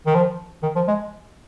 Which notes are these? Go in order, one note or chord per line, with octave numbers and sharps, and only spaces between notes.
D#3
F3
D#3
F3
G#3